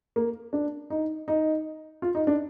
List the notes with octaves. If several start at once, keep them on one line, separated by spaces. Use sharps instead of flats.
A#3
D4
D#4
D#4
F4
D#4
D4